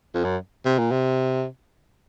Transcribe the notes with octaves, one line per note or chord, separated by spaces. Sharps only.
F2
F#2
C3
A#2
C3